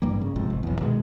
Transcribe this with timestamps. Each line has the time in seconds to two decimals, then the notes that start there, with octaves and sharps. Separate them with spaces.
0.02 A1 G2 G3 A#3
0.21 C#3
0.36 G1 G#2 C3 F3
0.50 F#1
0.63 B1 E2
0.79 B2 D#3 G#3